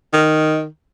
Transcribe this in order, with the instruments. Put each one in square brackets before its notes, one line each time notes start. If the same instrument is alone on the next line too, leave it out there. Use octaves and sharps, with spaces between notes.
[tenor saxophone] D#3